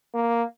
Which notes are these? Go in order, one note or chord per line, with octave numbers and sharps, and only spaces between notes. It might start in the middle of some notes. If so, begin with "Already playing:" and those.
A#3